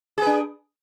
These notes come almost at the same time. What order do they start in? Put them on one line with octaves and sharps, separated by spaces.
G#4 B4 D4